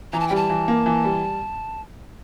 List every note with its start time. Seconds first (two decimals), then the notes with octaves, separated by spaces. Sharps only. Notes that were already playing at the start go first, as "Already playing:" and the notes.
0.13 E3 A#5
0.20 A5
0.28 G5
0.31 G3
0.36 A5
0.50 E3
0.68 A#3
0.86 E3
1.04 G3